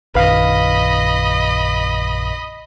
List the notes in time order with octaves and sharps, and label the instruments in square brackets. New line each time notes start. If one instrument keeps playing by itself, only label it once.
[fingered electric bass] A#1 F#2 D#3 [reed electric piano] B4 F5 [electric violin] D#5 B5